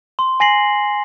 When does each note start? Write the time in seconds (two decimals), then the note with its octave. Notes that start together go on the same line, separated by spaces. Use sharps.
0.19 C6
0.40 G#5 A#6 C7 F#7